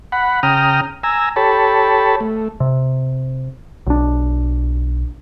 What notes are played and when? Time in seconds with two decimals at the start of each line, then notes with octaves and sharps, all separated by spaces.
0.12 F#5 B5
0.43 C#3 G5 A#5 D#6 F6
1.03 G#5 A#5 E6
1.36 G4 A4 C#5 A5 B5
2.20 A3
2.60 C3
3.87 B1 D4